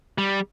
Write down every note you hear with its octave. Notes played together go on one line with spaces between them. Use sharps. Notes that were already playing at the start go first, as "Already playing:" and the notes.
G3